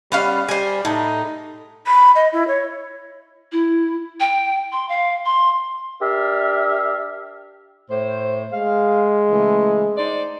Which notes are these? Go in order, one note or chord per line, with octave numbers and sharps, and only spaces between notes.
G3 B3 C#4 F5
G3 C5 G#5
A2 D#4
B5
D#5
E4
C#5
E4
G5
C6
F5
C6
D4 G4 A#4 D5 E5 F5
A2 C5
G#3 F5
C#3 E3 A3
D#4 C5 D5